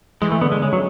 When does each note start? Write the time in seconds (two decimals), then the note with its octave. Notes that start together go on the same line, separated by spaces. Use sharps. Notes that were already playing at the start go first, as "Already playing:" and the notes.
0.22 E3 G#3
0.32 A3
0.41 D3 B3
0.52 G#3
0.62 C#3 G#3
0.73 F#3